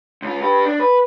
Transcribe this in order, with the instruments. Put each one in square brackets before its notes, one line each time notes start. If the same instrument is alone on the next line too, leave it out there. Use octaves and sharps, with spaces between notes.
[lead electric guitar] C#2 F4
G4 B4
D4
B4